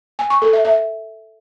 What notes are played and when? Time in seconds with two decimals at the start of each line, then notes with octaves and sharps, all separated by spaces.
0.19 G#5
0.30 C#6
0.42 A4
0.53 E5
0.65 E5